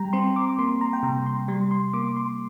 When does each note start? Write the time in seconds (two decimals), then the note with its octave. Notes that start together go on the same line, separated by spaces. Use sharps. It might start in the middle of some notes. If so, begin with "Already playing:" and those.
Already playing: G3 G5 A#5
0.13 C4 C6
0.36 D6
0.58 A#3 C6
0.81 A#5
0.93 G5
1.03 C3 A#5
1.26 C6
1.48 G3 C6
1.71 C6
1.93 A#3 D6
2.16 C6